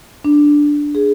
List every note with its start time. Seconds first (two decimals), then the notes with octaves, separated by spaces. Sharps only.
0.25 D4
0.95 G#4